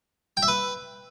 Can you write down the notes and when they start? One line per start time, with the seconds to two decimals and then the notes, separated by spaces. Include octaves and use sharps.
0.37 G5
0.43 E5
0.48 B4